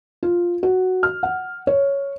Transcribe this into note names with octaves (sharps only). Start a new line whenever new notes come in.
F4
F#4
F6
F#5
C#5